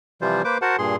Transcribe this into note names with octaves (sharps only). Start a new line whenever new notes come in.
C3 E3 F3 G3 F4 C5
A#3 B4 C5 D6
F#4 A#4 C5 F#5 A5
G2 A#2 G#4 C6